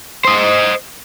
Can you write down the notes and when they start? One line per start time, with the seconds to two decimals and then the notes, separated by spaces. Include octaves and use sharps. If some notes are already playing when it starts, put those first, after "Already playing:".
0.25 C5 D#5